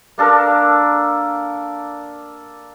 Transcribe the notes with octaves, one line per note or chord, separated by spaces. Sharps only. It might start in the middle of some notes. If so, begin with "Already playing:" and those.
A#3 D4 A4 A#4